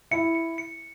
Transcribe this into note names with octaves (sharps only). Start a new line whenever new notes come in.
E4 C#7
C#7
C#7